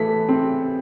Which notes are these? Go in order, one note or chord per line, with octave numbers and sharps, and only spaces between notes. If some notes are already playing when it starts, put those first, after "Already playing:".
Already playing: E3 A3 B6
C4